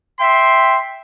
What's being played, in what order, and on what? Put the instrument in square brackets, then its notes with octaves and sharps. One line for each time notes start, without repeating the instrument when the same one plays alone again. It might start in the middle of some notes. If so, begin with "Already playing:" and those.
[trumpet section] E5 G5 C6